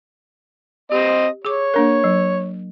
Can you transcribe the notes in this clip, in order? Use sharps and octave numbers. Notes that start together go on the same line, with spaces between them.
C4 G4 D#5
G#4 C#5 D6
A#3 D4 A#4
F#3